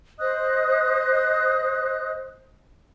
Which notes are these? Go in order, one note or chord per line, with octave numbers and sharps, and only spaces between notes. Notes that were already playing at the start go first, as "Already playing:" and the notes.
C5 D#5 D#6 F#6